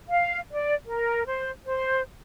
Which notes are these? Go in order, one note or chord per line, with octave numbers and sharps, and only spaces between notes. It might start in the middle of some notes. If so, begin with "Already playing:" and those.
F5
D5
A#4
C5
C5